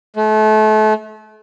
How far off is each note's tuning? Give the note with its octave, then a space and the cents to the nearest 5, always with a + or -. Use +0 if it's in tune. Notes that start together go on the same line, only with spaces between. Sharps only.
A3 -35